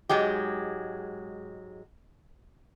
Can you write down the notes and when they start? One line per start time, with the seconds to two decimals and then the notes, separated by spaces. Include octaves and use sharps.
0.09 G#2 F#3 G#3 G4